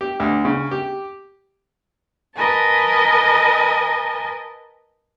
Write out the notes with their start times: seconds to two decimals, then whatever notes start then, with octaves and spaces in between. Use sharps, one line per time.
0.01 G4
0.20 D2
0.45 C#3
0.71 G4
2.34 A#4 B4 D#5 G#5 A5